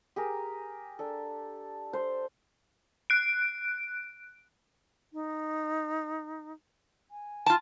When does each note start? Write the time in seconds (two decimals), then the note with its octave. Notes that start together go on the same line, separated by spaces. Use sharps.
0.16 G4 G#4 A#4
0.99 D4 A4
1.93 C5
3.10 F#6 D7
5.13 D#4
7.11 G#5
7.46 F4 A5